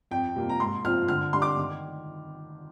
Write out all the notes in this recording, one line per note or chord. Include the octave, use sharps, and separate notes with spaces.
F2 G5
C3 G3 A#3 F4
A#5
G#2 C6
F3 C4 F4 F6
D3 F6
G3 D4 C6
D6
D#3